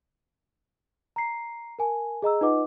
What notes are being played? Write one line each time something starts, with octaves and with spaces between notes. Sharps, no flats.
A#5 C7
A#4 G#5 A5
G#4 D#5 A#5 E6
D#4 F4 B4 D#5 F#5 D6